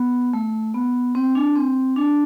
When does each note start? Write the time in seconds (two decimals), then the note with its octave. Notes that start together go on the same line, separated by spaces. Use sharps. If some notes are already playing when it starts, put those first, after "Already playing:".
Already playing: B3
0.33 A3
0.74 B3
1.15 C4
1.35 D4
1.55 C4
1.96 D4